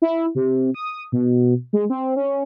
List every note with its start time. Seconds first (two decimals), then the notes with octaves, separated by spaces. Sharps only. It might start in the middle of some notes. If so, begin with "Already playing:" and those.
0.02 E4
0.35 C3
0.74 D#6
1.12 B2
1.73 G#3
1.90 C4
2.16 C#4